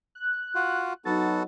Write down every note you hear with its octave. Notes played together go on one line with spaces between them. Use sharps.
F#6
F4 F#4
F#3 B3 D#4 F#4 A4 A6